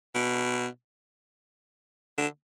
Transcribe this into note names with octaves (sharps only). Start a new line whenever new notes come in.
B2
D3